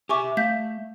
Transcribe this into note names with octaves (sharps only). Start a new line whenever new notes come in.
G4 E5 G#5 C#6 D6
A3 F5 G6 B6